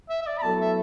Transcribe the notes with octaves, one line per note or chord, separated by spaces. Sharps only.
E5
E5
D5
B5
B2 F#3 A3 E4 A4 A5
E5